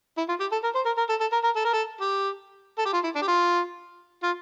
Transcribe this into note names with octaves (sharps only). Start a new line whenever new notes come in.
E4
F4
G4
A4
A#4
C5
A#4
A#4
A4
A4
A#4
A#4
A4
A#4
A4
G4
A4
G4
F4
E4
D4
G4
F4
F4